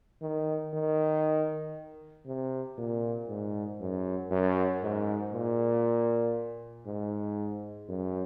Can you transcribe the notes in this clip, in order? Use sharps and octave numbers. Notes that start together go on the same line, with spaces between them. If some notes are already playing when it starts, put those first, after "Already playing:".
D#3
D#3
C3
A#2
G#2
F#2
F#2
G#2
A#2
G#2
F#2